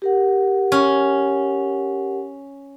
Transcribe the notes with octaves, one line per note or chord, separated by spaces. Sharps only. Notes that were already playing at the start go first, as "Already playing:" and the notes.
G4 A#4 F#5
C#4